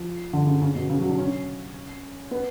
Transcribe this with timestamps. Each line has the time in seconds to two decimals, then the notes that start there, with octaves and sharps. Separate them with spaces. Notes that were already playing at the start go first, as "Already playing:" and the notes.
Already playing: F3
0.33 D3
0.47 C#3
0.62 C#3
0.75 B2
0.90 C#3
0.99 F#3
1.09 D4
1.18 C#4
2.31 B3